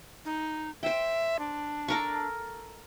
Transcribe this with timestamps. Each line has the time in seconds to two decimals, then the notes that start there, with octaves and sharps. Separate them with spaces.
0.25 D#4
0.83 C5 E5 G5
1.39 D4
1.88 A4 A#4 C#6